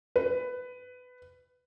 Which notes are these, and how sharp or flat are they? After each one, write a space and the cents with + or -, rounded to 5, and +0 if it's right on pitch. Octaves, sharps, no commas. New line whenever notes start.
B4 +15